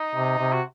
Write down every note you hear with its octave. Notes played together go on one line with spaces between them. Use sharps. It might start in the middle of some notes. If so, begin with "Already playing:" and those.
Already playing: D#4
C3
C3
F#4